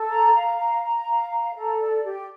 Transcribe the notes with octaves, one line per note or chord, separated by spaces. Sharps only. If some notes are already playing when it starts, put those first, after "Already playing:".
Already playing: A4
A#5
F5
A#5
A#5
F5
A#5
A4
D5
G4